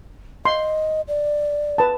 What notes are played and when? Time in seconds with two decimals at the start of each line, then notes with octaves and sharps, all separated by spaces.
0.45 D#5 C6
1.08 D5
1.78 B4 A5